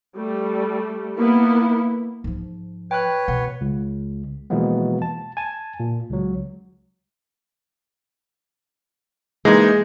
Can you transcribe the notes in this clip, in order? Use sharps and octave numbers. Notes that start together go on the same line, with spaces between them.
G3 A3
A#3 B3 E4
G#2 F3
B4 C#5 G5 F#6
B2 F#5
C#2
B2 E3 F3 G#3 A#3 B3
A5
G#5 A5
A#2
C#2 F#3
E3 G#3 A#3 D#4